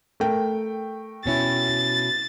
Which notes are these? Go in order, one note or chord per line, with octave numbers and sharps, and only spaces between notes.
A3 A#4 G5
B2 C#4 E4 A6